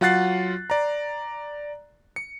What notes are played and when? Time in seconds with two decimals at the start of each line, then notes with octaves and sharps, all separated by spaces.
0.01 F#3 F4 F#5 F#6 A6 C7
0.70 D5 A#5
2.16 C#7